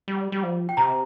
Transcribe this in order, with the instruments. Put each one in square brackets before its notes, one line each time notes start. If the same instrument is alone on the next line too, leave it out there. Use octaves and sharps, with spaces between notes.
[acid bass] G3
G3
F3
[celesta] G5
[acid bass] C3 [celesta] A#5